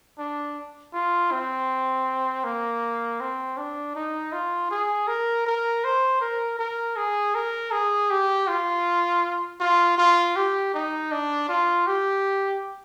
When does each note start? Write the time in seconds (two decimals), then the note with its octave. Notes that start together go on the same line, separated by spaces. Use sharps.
0.19 D4
0.93 F4
1.32 C4
2.44 A#3
3.20 C4
3.58 D4
3.95 D#4
4.32 F4
4.71 G#4
5.08 A#4
5.47 A#4
5.84 C5
6.21 A#4
6.59 A#4
6.97 G#4
7.35 A#4
7.72 G#4
8.10 G4
8.48 F4
9.61 F4
9.98 F4
10.36 G4
10.74 D#4
11.12 D4
11.49 F4
11.87 G4